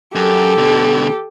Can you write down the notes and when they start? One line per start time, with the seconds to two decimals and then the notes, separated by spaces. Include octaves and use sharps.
0.15 F#2 G4 A4
0.58 B2 D3